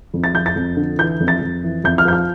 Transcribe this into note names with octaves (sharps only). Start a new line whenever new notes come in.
F2
A6
F3 G6
A6
F2
D3
E3 G6
F2
A6
F2
E3
F2 G6
F6
F3 G6
F6